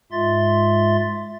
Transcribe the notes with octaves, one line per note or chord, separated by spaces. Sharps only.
G#2 G#3 F4 E5 C6 A6